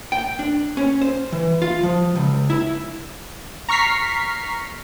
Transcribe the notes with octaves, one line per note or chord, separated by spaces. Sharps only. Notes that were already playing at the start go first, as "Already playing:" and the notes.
G5
D4
C#4
C5
E3
F4
F3
C#2
E4
A#5 C#6 F6 B6 C7